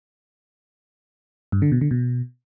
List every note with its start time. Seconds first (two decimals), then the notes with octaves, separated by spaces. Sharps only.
1.52 G2
1.62 D3
1.72 B2
1.81 D3
1.91 B2